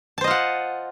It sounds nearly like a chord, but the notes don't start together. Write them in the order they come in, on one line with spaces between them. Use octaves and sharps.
A5 C5 D#5 F4 F#5